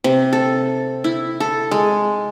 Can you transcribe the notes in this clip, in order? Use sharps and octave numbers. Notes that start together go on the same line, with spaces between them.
C3
A4
E4
A4
G#3